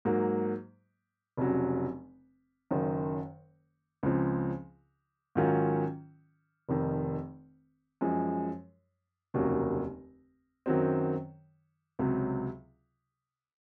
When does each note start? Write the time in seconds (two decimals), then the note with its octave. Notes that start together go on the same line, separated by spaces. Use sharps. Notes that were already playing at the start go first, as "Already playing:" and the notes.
0.05 G#2 F#3 A#3
1.37 F1 F2 C#3 F#3
2.71 F#1 F#2 D#3
4.03 C#2 C#3 F3 C4
5.35 G#2 D#3 F#3 C#4 F4
6.69 F1 F2 D#3
8.01 F#2 F3 G#3
9.34 F1 D#2 C#3 F#3 A#3
10.66 F#2 D#3 F#3 C4
11.99 C#2 C3 F#3